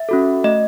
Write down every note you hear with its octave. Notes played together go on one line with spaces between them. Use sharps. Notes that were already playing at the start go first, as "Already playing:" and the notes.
Already playing: E5
C#4 F#4 A4
A3 D#5